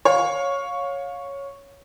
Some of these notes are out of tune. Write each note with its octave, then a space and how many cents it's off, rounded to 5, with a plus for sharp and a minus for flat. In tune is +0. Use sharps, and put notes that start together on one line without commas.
C#5 +0 F5 +25